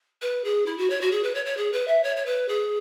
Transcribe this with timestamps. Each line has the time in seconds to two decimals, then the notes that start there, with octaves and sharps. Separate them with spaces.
0.22 B4
0.44 G#4
0.66 E4
0.78 F#4
0.90 C#5
1.01 F#4
1.11 G#4
1.23 B4
1.34 C#5
1.46 C#5
1.57 G#4
1.72 B4
1.88 E5
2.03 C#5
2.17 C#5
2.26 B4
2.48 G#4